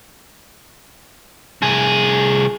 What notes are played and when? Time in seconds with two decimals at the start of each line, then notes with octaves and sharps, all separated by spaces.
1.62 C2 G#4